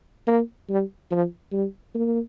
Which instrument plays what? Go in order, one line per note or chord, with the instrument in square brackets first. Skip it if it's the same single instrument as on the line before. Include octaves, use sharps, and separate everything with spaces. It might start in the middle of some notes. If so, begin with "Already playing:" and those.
[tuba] A#3
G3
F3
G3
A#3